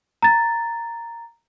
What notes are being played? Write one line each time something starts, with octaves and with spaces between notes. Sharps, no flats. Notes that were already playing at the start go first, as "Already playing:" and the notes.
A#5 A6